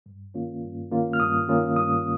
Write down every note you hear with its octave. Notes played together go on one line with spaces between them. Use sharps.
G2
D#3 A#3 C#4 F4
G2
D#3 A#3 C#4 F4
F6
G2 D#6
D#3 A#3 C#4 F4
G2 D#6